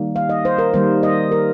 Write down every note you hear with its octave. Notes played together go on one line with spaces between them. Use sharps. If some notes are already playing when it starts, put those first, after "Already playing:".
Already playing: D#3 G3 A#3
F5
D#5
C5
A#4
D#3 G3 A#3 C5
D#5
A#4